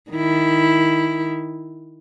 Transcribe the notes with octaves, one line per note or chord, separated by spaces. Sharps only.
D#3 E4